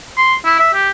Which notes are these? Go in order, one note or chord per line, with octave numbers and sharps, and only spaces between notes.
C6
E4
E5
G4